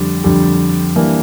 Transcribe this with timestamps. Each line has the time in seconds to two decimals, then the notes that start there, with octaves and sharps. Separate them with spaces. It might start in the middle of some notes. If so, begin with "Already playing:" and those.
Already playing: F2 D3 G3
0.24 F2 D3 G3
0.96 E3 G3 A#3 D4